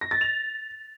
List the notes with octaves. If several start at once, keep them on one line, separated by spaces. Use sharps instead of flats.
A#6
A6
F7